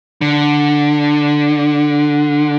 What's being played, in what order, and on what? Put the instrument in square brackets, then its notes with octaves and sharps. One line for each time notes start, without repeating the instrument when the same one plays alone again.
[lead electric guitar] D3